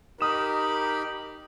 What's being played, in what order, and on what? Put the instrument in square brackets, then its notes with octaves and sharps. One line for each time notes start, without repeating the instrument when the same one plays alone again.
[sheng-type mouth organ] D#4 G4 B5 [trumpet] A#4 [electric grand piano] D#6 E7